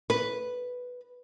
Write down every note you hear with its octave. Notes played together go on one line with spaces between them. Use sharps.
B4